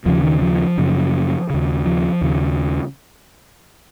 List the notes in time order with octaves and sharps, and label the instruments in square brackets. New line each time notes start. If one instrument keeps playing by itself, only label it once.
[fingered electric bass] D#2 C#3 F3
D#3
F3
F#2 C#3
D#2 C#3
F3
D#2 C#3